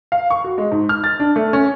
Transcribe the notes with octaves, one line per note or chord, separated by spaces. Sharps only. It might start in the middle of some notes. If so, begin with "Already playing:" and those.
F5
C#6
F#4
G#3
G#2
F6
A6
D4
A3
C#4